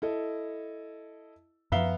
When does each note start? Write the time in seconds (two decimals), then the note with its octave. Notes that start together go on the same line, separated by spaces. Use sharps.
0.02 E4 A4 D#5
1.72 F#2 F3 B3 E5 F5 A#5 G7